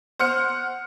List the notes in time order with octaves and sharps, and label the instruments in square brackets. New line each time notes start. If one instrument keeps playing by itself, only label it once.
[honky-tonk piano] C5 F#5 F6 C#7